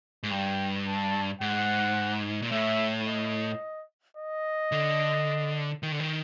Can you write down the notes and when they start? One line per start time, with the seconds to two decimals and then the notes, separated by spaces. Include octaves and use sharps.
0.23 G#2
0.31 G2 G5
0.87 A5
1.41 G#2 F#5
2.42 A#2
2.52 A2 E5
3.07 D#5
4.17 D#5
4.72 D3
5.83 D#3
5.92 D3
6.00 D#3